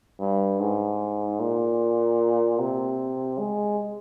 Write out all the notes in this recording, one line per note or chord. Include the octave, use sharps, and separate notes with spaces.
G2
G#2
A#2
C3
G#3